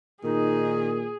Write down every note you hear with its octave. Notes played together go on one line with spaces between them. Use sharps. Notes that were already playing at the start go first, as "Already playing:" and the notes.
A#2 D#3 D#4 G#4